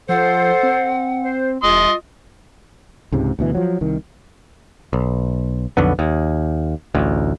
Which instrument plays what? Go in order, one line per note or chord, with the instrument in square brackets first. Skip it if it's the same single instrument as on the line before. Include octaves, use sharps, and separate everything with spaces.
[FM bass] F3 [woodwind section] A4 C5 [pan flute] F#5
[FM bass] C4
[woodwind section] C5
[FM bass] E1 [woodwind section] F4 D#5 [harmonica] C6 D#6
[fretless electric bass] C#2 G#2 C3
D2 B2 E3
F3 F#3
C2 D#3
[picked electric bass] B1
B1 F2 D3 B3
D#2
A1 D2